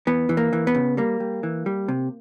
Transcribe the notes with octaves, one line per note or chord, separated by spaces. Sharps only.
E3 B3
E3
A#3
E3
B3
C#3
G3 A#3
G3
E3
G3
C3